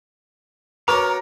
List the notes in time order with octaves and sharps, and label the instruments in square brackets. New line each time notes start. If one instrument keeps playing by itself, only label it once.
[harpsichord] B3 F#4 C#5 [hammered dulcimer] A#4 [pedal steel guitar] A#5 D6